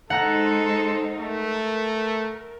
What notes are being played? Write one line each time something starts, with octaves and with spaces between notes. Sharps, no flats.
G#3 D#4 A4 C5 F#5 A#5 F#6
A3 A#4